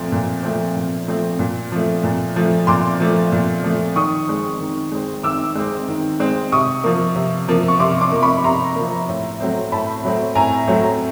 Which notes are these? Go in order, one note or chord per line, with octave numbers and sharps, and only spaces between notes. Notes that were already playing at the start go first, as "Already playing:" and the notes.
Already playing: A#2 F3 A3 C4
A#2
F3 A3 C4
A#2
F3 A3 C4
A#2
F3 A3
A#2
F3 A3
A#2 C6 D6
F3 A3
A#2
F3 A3
D#3 C#6 D#6
G#3 C4
D#3
G#3 C4
D#3 D6 E6
G#3 C4
D#3
G#3 C4
C3 C#6 D#6
F3 A#3
C3
F3 A#3
C#6
C3 C6 D6
C6 D6
F3 A#3
B5 C#6
C3 A#5 C6
F3 A#3
A2
F#3 A3 C4
A2 A5 B5
F#3 A3 C4
A2 G#5 A#5
F#3 A3 C4